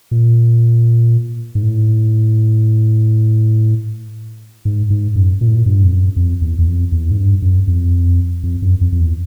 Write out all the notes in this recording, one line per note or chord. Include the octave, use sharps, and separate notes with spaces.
A#2
G#2
A2
G#2
G#2
F#2
A#2
A2
A#2
G2
F2
F#2
F2
E2
E2
F2
E2
G#2
G2
F#2
F2
F2
F#2
F2
F2
E2